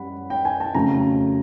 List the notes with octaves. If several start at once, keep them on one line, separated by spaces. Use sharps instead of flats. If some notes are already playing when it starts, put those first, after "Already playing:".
Already playing: F#2 G3 F#5 B5
G5
G#5
A5
F2 C#3 F#3 A3 A#5